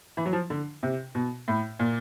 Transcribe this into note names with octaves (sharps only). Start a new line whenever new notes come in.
E3
F#3
F3
D3
C3
B2
A2
A#2